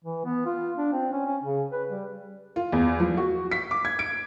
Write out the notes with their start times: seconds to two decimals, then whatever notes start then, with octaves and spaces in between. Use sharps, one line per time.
0.04 E3
0.25 B3
0.46 F4
0.78 D4
0.92 C4
1.12 C#4
1.26 C#4
1.43 C#3
1.72 B4
1.90 G3
2.56 F4
2.72 E2
3.00 F3
3.17 F#4
3.51 B6
3.71 D6
3.85 G#6
3.99 D7